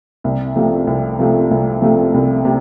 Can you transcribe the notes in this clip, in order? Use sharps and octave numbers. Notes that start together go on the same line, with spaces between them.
C2
C3 F3 A3
C2
C3 F3 A3
C2
C3 F3 A3
C2
C3